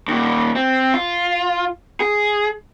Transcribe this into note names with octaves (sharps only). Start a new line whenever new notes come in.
D#2 A#2
C4
F4
G#4